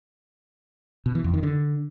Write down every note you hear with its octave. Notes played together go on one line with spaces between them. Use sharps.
B2
E3
F2
D#3
D3